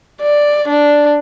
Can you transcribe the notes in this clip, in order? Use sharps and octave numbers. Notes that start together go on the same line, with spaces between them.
D5
D4